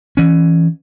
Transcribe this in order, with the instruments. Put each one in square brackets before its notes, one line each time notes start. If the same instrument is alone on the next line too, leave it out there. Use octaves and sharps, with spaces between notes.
[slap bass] E3 C#4